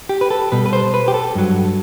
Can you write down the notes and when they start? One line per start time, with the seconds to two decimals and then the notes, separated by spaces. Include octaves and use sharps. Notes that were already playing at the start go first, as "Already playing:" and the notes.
0.09 G4
0.21 B4
0.30 A4
0.52 B2 G3 B4
0.66 B4
0.73 C5
0.94 B4
1.08 G4
1.14 A4
1.35 G2 F#3